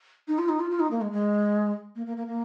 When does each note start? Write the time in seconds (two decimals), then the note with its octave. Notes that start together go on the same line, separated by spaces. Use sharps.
0.28 D#4
0.38 F4
0.49 D#4
0.60 F4
0.70 F4
0.80 D#4
0.91 A#3
1.01 G#3
1.11 G#3
1.96 A#3
2.06 A#3
2.17 A#3
2.27 A#3